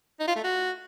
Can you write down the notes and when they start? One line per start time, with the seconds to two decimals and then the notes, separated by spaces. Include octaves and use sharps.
0.20 D#4
0.28 F4
0.36 A3
0.44 F#4